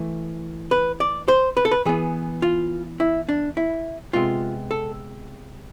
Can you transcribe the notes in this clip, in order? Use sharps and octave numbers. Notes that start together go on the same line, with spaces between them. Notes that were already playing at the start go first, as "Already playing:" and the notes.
Already playing: E3 A3
B4
D5
C5
B4
A4
B4
E3 B3 G#4
F4
E4
D4
E4
C3 G#3 B3 F4
A4